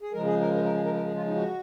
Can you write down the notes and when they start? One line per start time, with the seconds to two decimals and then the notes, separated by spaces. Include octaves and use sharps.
0.01 G#4
0.13 C#3 F3 G#3 A#4
0.26 G#4
0.41 A#4
0.54 A#4
0.64 A#4
0.74 G#4
0.84 A#4
0.94 A#4
1.05 G#4
1.15 F4
1.26 D#4
1.35 F#4